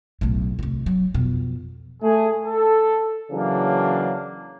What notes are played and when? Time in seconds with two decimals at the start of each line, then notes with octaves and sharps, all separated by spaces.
0.21 B1 A2
0.59 D2 C3
0.86 F#3
1.14 F2 B2
2.02 A3 G#4
2.45 A4
3.32 C#3 E3 F#3 A#3 D4